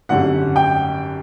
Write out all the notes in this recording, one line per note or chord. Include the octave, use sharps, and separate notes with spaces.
G#1 F#2 D3 G3 F#5
G5